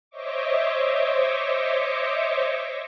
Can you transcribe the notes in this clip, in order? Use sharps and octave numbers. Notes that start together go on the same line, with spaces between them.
C5 C#5 D#5 E5 C#6 D6